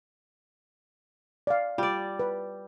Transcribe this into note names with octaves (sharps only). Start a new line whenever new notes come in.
D5 F5
G3 F4 D5
B4